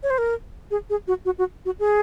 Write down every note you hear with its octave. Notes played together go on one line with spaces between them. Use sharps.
C#5
C5
A#4
G#4
G#4
F#4
F#4
F#4
F#4
G#4